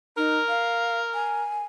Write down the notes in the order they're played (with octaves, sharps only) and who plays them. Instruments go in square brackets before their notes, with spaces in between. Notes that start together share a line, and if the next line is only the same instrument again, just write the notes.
[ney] D#4 [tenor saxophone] A#4
[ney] F5
G#5